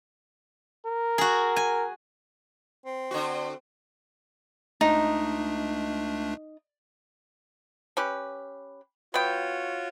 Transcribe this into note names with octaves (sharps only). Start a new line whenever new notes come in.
A#4
F#4 G#4
G#5
C4
D3 F#4
C#2 A3 D4 D#4
C#4 G4 B4
B3 F4 F#4 C#5 G5